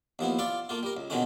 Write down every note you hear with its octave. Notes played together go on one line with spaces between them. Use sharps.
D#2 F3 B3 E4
F4 D5 E5 F5
A3 A#3 F4
G3 A#4
C#2
B2 D3 D#3 G#3 A3 C#4